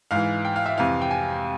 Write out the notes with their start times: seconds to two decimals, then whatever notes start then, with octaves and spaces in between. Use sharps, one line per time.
0.11 G#2 E3 F5
0.45 G5
0.56 F5
0.66 E5
0.77 F2 C3 E3 F5
1.01 G5
1.11 G#5